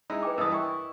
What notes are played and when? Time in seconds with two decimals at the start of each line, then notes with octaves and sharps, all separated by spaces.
0.10 G#3 D#4 E4
0.23 B4 G5 D6
0.38 G2 E3 A#4 D#5 D#6
0.51 E4 D#5 G5 C#6